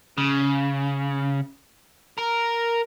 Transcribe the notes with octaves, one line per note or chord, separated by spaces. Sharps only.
C#3
A#4